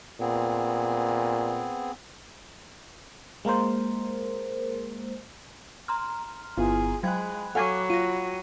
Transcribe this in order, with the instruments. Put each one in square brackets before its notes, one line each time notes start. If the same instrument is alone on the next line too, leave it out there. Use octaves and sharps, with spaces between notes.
[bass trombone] A#2 [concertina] B3 C4 G#4
[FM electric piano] G#3 A#3 A#4 C5
[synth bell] A#5 C6 F6
[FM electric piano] G1 B3 E4 [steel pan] F4 [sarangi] G#4
[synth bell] F#3 G#6 [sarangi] G#3 [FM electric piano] G5 B5 F#6
[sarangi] F#3 [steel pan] A4 F5 G#5 [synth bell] F#5 C#6 D6
[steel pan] F4 [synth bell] A#6 D#7